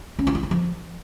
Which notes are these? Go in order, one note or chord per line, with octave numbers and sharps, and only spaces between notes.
C#4
F4
E4
D#4
F3